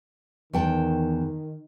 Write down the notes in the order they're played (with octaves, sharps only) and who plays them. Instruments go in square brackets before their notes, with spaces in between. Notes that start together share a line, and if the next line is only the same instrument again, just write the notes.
[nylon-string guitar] E2 G5 A5 [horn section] D#3